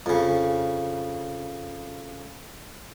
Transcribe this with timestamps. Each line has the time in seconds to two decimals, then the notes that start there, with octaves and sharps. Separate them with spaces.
0.06 F2 C#3